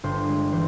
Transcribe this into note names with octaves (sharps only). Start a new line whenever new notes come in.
G1 C5
G#3
E3 C5